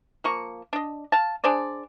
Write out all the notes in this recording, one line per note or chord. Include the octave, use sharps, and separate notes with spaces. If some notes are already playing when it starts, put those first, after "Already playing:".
F3 A#3 C#6
D4 D#5
F5 A5
D4 G#4 C5 D5